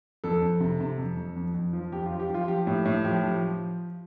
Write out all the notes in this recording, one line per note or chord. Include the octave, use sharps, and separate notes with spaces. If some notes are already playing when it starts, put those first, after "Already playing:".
F2 A4
F2
C3
C3
F2
F2
F2
F2
F3
F2 G4
F4
F3
G4
F3 F4
F3 G4
A2
A2
F3 G4
F3
F3